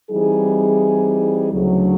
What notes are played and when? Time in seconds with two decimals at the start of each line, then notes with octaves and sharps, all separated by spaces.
0.10 E3 G3 C4 D#4 G#4
1.52 D2 C#3 F#3